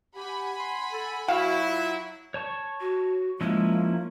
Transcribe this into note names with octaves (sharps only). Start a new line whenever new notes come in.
G4 F#5 G#5 B5
C6
A4
F#3 E4 F#4 F5
F4 F#5
C#5 A5 C#6
F#4
F3 G#3 A#3 C#4 E4